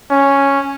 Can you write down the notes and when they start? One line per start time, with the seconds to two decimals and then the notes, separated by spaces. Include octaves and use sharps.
0.11 C#4